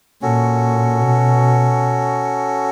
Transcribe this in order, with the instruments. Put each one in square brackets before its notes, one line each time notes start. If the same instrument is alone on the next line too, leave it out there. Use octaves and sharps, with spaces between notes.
[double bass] A#2 [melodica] C#4 F#4 A4
[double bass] B2